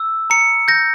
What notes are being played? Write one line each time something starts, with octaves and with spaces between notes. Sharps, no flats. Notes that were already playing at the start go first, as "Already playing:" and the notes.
Already playing: E6
A#5 C#7
G6 A#6